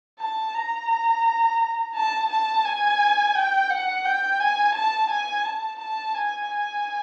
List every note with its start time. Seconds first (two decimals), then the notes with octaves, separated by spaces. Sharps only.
0.19 A5
0.54 A#5
1.95 A5
2.29 A5
2.65 G#5
3.35 G5
3.70 F#5
4.05 G5
4.40 G#5
4.74 A5
5.10 G#5
5.45 A5
5.79 A5
6.15 G#5
6.49 G#5